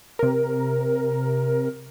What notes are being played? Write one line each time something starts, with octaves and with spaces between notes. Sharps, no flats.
C3 A#4